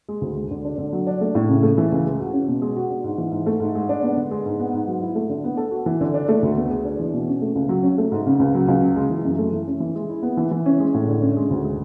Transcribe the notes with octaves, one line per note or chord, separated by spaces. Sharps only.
G#3
D2
G#3
D3
D4
D3
F#3
D4
A3
A2
C#3
A3
E3
C#2
G#3
F#4
C#4
B2
G#3
F#4
D4
G#2
E3
G#2
A3
G#2
G#3
D4
B3
D3
G#3
G#2
B3
G#2
F#3
E4
A3
D3
B3
A4
F#4
E3
D3
D4
A3
D2
B3
G#4
D4
E3
B2
C#4
A3
C#2
F#3
C#4
A3
G#2
C#3
C#2
F#3
C#2
C#3
G#3
E3
F#2
A3
E3
C#4
E3
G#3
E4
B3
E3
E3
C#4
G#3
A2
D3
C#4
G#3
D2
G#3